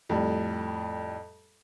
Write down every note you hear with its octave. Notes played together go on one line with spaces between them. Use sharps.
F2 A2 G3